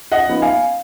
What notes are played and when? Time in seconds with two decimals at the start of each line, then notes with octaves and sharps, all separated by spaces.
0.12 D#5 F#5
0.27 F3 B3 D#4
0.42 F5 G#5